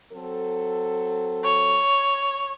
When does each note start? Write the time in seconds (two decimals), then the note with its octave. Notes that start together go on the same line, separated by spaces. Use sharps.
0.12 F#3 C4 A4
1.44 C#5